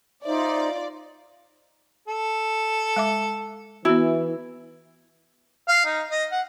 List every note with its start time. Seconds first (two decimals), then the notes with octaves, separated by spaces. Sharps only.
0.24 D#4 F4 C5 D5 E5
2.08 A4
2.96 G#3 E5 D6
3.85 E3 B3 E4 F#4
5.68 F5
5.85 D#4
6.11 D#5
6.31 F#5